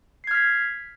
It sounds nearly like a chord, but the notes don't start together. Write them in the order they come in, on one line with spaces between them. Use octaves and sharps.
C7 G#6 F6 B6